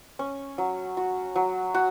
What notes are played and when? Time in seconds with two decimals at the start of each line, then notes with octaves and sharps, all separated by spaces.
0.19 C#4
0.58 F#3
0.97 F#4
1.36 F#3
1.74 F#4